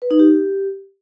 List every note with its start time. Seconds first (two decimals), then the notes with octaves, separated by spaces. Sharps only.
0.02 B4
0.11 D#4
0.19 G4